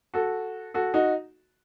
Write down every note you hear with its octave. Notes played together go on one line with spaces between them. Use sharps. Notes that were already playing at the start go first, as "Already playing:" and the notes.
F#4 A4
F#4 A4
D#4 F#4